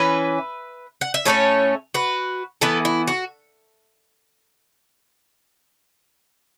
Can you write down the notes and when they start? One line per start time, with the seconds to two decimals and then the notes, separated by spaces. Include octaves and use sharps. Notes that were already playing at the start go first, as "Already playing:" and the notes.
Already playing: E3 C#4 B4 E5
1.01 F#5
1.14 E5
1.25 A2 A3 C#4 A4 C#5
1.94 F#4 B4
2.61 E3 B3 E4 A4
2.85 E4
3.08 F#4